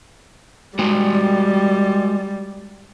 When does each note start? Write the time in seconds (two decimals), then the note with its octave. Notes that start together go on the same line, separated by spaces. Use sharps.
0.79 G3 G#3 F#4